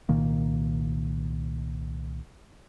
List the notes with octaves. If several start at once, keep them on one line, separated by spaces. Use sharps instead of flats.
C2 A#2 D#3 A#3